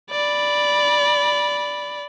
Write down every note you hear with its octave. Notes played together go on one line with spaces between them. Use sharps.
D5 B5